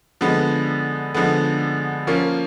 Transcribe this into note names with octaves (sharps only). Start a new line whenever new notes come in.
D3 F3 G#3 B3
D3 F3 G#3 B3
F3 A#3 C#4 F4